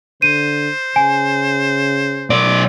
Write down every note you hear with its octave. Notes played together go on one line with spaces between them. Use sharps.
D3 C5 D#7
C#3 G#5
B1 D5